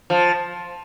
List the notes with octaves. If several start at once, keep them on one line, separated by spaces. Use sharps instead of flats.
F3